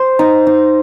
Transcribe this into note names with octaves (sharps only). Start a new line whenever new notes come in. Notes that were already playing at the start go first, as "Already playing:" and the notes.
Already playing: C5
D#4
D#4